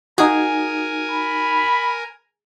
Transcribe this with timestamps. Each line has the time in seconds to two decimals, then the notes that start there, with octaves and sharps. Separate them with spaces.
0.18 D#4 F#4 G#4 A#4 G#5
1.11 B5